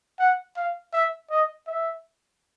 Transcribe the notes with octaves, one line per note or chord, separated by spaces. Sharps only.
F#5
F5
E5
D#5
E5